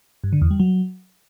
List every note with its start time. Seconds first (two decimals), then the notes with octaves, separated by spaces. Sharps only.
0.24 G2
0.33 D3
0.42 E2
0.51 G3
0.60 F#3